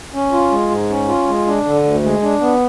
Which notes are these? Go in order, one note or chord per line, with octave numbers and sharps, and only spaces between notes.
C#4
F4
G#3
G#2
C#4
F4
G#3
D4
D3
D2
G#3
D4
B3